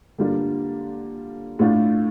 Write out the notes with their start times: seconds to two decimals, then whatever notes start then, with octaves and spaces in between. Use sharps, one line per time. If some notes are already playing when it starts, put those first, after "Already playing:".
0.18 D3 G3 A#3 D4 F4
1.59 A2 A3 D4 F4